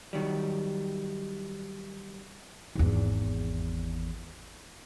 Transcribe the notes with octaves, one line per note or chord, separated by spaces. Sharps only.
D#3 F#3 G3
G#1 E2